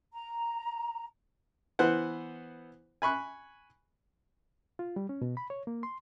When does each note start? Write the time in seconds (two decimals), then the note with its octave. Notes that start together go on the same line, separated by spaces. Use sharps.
0.13 A#5
1.79 E3 B3 C5 F#5
3.02 G#5 B5 C#6 F#6
4.79 F4
4.96 G3
5.09 C#4
5.22 B2
5.37 B5
5.50 C#5
5.67 A#3
5.83 C6